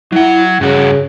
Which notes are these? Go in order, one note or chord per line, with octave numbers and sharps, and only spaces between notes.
F#3 E4 F#5
G2 C#3 F#4